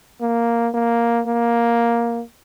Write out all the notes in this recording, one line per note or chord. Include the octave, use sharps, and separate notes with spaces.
A#3
A#3
A#3